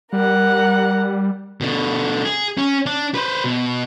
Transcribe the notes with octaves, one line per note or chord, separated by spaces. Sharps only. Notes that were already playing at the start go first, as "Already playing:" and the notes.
G3 A#4 F#5
B2 D3
G#4
C#4
D4
B4 C5
B2